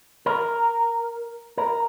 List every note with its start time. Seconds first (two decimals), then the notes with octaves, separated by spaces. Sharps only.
0.26 A#4
1.58 A#4